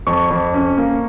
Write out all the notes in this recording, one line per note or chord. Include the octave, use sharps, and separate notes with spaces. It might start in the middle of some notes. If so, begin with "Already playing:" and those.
F2 C#6
F2
C#4
A#3